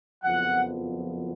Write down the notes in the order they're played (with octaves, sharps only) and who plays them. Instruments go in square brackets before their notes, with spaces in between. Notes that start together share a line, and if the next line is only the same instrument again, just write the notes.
[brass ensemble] F#1 F2 F3 B3 F#5